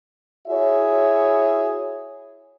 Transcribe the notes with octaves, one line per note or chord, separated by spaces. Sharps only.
E4 F#4 G#4 C#5 E5